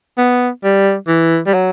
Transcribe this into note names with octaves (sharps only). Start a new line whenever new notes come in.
B3
G3
E3
G3
F#3